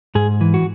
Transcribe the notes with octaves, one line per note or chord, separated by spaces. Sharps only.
G#2 G#4
E3
F#4